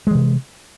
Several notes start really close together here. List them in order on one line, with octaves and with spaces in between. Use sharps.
G#3 E3 C3